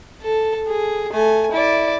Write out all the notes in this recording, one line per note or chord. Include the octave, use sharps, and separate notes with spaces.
A4
G#4
A3 G#5
E4 D5